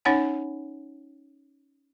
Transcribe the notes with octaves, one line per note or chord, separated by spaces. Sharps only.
C#4 D#4 C#5 F#5 G#5